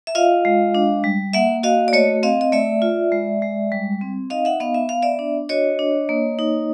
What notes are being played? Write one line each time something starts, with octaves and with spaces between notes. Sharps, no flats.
E5
F4 D#5 F5
G#3
D4
G3
A#3 E5 F#5
F#4 D#5 F5
D5
A3 C#5 D#5
C4 D#5 F5
D#5
A3 D5 E5
F4
G#3
G#3
G3
C4
D#4 D#5 F5
E5 F#5
B3 D#5 F5
E5
B3 F5
D5 E5
D4
F#4 C#5 D#5
D4
A#3
D#4